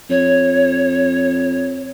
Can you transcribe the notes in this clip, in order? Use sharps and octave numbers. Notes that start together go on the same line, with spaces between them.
F2 C#5